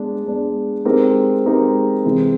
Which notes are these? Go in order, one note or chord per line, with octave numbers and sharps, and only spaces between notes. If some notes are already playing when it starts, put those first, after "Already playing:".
Already playing: G#3 B3 D4
G#3 B3 D4
G#3 C4 D#4 G4 A#4
G#3 C4 D#4 G4 A#4
C3 E3 G#3 C4